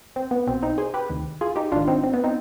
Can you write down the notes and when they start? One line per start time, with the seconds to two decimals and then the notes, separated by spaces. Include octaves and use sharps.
0.16 C4
0.31 B3
0.47 B1 B2 C4
0.63 C4 D#4
0.78 G#4 C5
0.94 G4 B4
1.10 D2 C3 D#3
1.41 F4 G#4
1.56 D#4 G4
1.72 G#1 G#2 D#3 D4 F4
1.88 C4 D#4
2.04 C4
2.14 B3
2.24 C4 D#4